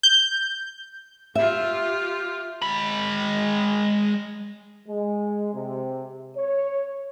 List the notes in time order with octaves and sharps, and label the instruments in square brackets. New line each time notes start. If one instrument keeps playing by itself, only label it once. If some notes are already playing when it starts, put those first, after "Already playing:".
[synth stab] G6
[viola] F4 G4 [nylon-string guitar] E5
[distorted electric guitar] G#3 B5
[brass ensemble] G#3
C3
C#5